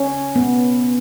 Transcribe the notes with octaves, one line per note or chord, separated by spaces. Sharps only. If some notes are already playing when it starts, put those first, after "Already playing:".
Already playing: C#4
B3